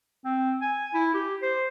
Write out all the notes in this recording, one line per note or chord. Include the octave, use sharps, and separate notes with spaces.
C4
G#5
E4
G4
C5